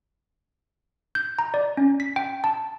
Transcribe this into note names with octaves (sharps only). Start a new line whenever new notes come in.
G6
A#5
D5
C#4
B6
G5
A5